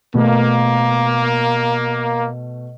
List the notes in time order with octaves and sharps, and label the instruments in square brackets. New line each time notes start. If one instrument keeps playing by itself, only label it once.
[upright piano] B2 A3 [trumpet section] A#3